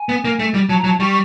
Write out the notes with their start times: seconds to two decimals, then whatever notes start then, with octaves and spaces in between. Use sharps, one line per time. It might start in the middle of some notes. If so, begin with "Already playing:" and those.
Already playing: G#5
0.09 B3
0.25 A#3
0.39 A3
0.54 G3
0.69 F#3 A5
0.78 A#5
0.84 F#3
0.88 A5
0.99 G3 C#6
1.10 C#6